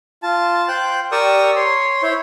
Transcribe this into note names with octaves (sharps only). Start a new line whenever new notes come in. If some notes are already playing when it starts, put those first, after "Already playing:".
F4 A5
C5 G5 F#6
G4 A#4 D5 C#6 D#6 E6
C#5 C6
E4 C5 C#5